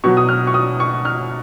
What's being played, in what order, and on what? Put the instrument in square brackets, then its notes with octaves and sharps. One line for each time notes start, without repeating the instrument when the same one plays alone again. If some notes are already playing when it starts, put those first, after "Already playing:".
[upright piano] B2 F#3 C#6
D#6
F6
C#6
D#6
C#6
F6